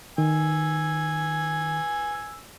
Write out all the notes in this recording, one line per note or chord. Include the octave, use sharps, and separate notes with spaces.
D#3 G#5 E6